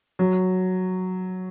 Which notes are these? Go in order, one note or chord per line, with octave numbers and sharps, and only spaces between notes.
F#3